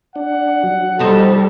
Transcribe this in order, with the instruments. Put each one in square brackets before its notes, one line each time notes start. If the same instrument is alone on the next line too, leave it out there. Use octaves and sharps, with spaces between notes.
[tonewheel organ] D4 [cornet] F#5
[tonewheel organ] F#3
[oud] F2 D#4 C5 [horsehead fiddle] G3 A4